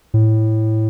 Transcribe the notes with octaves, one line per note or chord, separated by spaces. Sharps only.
A2